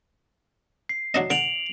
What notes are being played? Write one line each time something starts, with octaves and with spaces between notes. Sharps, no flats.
C7
F#3 D4 D#5
D3 D7 F7 F#7